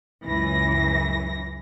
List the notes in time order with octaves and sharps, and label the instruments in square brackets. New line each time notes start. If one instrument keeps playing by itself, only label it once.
[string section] C#2 F#2 E3 A#6